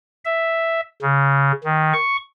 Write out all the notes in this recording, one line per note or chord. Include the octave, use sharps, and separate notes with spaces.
E5
C#3
D#3
C#6